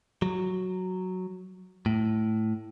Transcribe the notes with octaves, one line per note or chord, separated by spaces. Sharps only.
F#3
A2